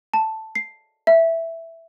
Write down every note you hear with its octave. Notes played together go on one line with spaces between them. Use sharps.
A5
C7
E5